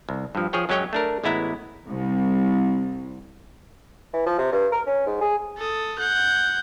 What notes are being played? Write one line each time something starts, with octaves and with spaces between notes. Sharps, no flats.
C2
G2 F3
F3 G#4 C#5 G5
F#2 F#3 G#3 C#4 C#5 G5
A3 D4 A#4
A1 G#3 B3 E4 E5 A#5
C2
E3
F3
C3
G2
A#4
C#4
G#2
G#4
A4 D#6
F#5 G6